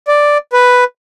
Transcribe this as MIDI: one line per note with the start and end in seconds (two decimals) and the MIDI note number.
0.08 0.38 74
0.53 0.84 71